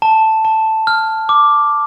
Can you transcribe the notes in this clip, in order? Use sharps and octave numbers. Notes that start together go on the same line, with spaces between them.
A5
A5
F6
D6